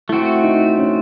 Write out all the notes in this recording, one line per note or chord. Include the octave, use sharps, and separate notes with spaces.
A3 C4 E4 F#4
D#4
C#4